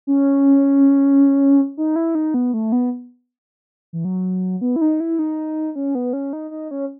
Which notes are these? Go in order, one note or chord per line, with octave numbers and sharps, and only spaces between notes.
C#4
D#4
E4
D#4
B3
A3
B3
E3
F#3
B3
E4
D#4
E4
D#4
C#4
B3
C#4
D#4
D#4
C#4